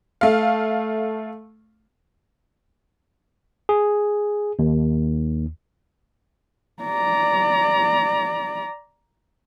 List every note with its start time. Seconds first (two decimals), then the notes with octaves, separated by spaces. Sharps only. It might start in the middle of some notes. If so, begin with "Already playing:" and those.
0.21 A3 F5
3.69 G#4
4.59 D#2
6.83 D5 A#5